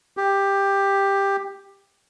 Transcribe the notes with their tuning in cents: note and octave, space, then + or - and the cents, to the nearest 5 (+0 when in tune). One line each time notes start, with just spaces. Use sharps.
G4 +10